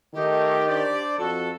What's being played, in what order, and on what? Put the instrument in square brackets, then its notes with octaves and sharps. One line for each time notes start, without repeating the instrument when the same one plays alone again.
[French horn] D#3 [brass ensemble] A3 D#4 [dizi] G4
[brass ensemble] D4 C5 D5
[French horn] F2 [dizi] F#4 [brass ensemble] A4